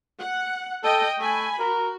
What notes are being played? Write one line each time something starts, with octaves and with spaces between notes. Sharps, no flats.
F#5
A4 D#5 G5
A3 G#5 B5
F#4 A#4